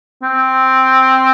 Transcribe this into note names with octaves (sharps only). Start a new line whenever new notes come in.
C4